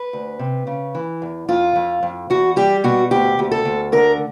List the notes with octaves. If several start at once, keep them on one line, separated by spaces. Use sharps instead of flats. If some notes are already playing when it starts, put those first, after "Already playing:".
Already playing: B4
D2
C3
C#3
E3
E2
F2 F4
F2
F2
E2 F#4
G3 G4
B2 F#4
D2 G4
D2
A4
D2
D3 A#4